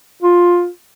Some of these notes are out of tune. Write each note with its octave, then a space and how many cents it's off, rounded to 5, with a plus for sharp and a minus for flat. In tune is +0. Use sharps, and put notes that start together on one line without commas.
F4 +10